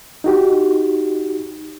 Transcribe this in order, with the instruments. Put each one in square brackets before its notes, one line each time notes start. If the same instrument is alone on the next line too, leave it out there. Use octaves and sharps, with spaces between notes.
[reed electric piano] D#4 F#4 G4